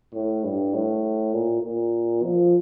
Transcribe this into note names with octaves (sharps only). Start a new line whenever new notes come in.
A2
G2
A2
A#2
A#2
F3